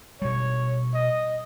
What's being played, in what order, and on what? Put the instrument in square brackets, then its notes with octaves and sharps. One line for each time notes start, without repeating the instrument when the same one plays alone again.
[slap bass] B2 G3 [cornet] C#5
[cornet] D#5